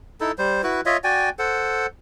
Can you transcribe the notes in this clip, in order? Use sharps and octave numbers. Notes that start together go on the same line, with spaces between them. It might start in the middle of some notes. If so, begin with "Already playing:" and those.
D#4 E4 A4
G3 C5
E4 F#4 B4
F4 C#5 D#5 E5
F#4 D5 G5 G#5
A4 C5 F#5